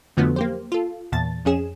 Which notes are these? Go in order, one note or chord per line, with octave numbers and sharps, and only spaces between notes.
F2 D3 F3 F#3 A3 B3
A#3 G4 C5
F4 A4
E2 A#2 A5 A6
F2 C#4 G#4 E7